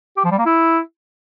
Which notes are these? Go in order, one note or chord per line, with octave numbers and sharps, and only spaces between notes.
G4
F3
G3
A#3
E4